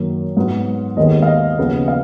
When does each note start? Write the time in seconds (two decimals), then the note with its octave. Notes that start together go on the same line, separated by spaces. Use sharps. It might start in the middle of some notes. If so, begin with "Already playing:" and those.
Already playing: F#2 D#3 F#3 A#3
0.37 G#2 F#3 B3
0.97 D#2 D#3 G#3 B3 D#5
1.22 F5
1.27 D#5
1.57 D#2 C#3 F3 B3
1.88 F5